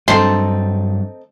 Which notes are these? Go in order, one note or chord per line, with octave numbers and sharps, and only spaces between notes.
G2 F#3 C4 D#4 A4 C6